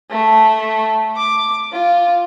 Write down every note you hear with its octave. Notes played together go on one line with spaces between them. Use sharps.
A3
D6
F4